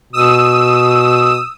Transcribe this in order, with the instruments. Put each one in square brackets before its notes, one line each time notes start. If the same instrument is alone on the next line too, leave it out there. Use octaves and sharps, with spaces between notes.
[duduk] B2 [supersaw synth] D#6 E6